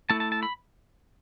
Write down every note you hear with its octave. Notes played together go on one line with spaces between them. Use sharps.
A3 E4 A5
A5
A5
B5